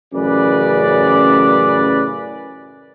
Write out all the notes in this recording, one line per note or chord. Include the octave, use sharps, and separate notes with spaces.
A1 F#2 C#3 B4 D5